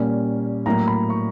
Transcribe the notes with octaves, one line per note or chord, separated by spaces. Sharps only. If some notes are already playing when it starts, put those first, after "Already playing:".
Already playing: A#2 G3 A#3 C#4
A2 F#3 A#3 A#5
B5
C#6